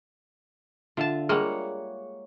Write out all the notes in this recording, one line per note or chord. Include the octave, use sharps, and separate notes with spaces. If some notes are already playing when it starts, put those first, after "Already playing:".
D3 F4 E5 A5
G3 G#3 A#3 G#4 C#5 F#5